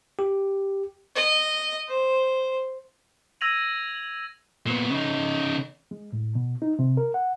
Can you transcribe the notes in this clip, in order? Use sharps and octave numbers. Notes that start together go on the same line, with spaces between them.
G4
D#5
C5
E6 G#6 A#6 D#7 F7 F#7
A#2 B3
C#3 D#4
G#3
A2
B2
D#4
C3
A#4
F#5